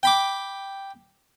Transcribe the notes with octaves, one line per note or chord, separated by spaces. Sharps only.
G5 B5 D6